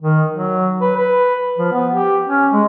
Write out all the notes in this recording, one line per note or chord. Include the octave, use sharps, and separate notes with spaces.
D#3
F#3
B4
B4
F3
B3
G4
C#4
G#3